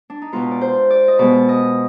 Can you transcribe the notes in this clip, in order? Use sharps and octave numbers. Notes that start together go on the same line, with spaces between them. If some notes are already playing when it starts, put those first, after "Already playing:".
D4
D#4
B2 G#3 B3 F4
D5
C5
D5
D#5
B2 G#3 B3 D5
D#5